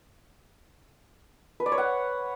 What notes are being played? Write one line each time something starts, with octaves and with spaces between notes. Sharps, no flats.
B4
D5
C#5
F#5